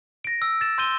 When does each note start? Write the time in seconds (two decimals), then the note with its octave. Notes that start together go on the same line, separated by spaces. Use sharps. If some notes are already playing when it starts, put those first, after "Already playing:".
0.24 A#6 D7
0.42 E6
0.61 A6 E7
0.78 C6 G6 D#7 G7